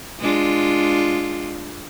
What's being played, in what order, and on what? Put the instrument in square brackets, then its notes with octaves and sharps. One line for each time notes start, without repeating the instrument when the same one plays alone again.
[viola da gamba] G#3 D4 F4